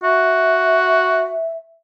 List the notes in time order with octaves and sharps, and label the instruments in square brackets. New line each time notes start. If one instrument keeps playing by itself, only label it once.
[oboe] F#4 [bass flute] E5